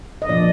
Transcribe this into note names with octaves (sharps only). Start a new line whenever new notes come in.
D#5
A#2 F3 A#3 D4 D5